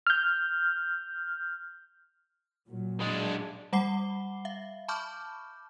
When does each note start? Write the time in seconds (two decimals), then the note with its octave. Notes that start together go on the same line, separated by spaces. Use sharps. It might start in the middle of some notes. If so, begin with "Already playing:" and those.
0.07 F6 G6
2.67 A#2 F#3
3.00 G#3 D4
3.73 G3 F#5 B5 D6 C7 G7
4.45 E5 F5
4.88 A5 B5 C#6 D6 F6 G6